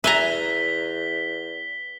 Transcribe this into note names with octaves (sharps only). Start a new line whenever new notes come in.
E2 B4 E5 G#5 A#5 B6 G7